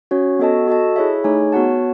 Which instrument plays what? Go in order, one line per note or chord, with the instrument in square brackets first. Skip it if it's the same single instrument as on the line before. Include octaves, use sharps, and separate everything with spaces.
[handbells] C#4 F#4 C#5
B3 F#4 A4 D#5 A5
F#4 A4 D#5 A5
E4 G#4 C#5 E5
A3 D#4 G#4 C#5 G#5
B3 F#4 C#5 F#5 A5